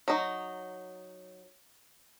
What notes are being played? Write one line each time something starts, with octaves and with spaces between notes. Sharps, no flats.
F#3 D#4